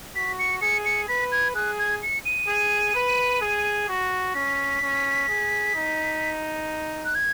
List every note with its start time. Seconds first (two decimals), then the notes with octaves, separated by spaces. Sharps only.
0.16 F#4 B6
0.39 C#7
0.61 G#4 C#7
0.85 C#7
1.08 B4 B6
1.32 G#6
1.55 G#4 F#6
1.79 G#6
2.02 C#7
2.25 D#7
2.48 G#4
2.95 B4
3.42 G#4
3.89 F#4
4.34 C#4 B6
4.82 C#4
5.29 G#4
5.75 D#4
7.05 F#6
7.15 G#6